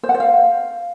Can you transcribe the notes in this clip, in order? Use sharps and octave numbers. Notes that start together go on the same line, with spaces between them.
C5
F#5
C5
F5